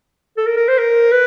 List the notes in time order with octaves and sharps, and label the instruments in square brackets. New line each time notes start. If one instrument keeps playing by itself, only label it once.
[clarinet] A4
A#4
A#4
C5
A#4
B4